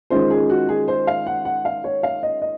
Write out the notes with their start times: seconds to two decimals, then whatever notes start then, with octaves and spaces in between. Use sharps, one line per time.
0.10 D#3 G#3 C#4 F4 C5
0.31 G#4
0.50 F#4
0.69 G#4
0.88 C5
1.07 F5
1.27 F#5
1.45 F#5
1.65 F5
1.84 C#5
2.03 F5
2.23 D#5
2.42 D#5